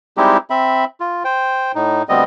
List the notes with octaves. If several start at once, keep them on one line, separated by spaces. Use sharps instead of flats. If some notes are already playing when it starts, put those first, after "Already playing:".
G3 G#3 C4 D#4 E4 G4
C4 E5 B5
F4
C5 G5
A2 D#4
D2 G3 B3 C4 D#5